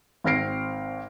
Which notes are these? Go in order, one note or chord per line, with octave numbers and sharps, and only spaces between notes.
G#1 C4 F6 A#6 C7 D7